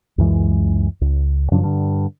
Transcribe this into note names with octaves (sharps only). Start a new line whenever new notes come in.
C#2 F#2 E3 G#3
C#2
F#2 C#3 F3 D4
G2 D3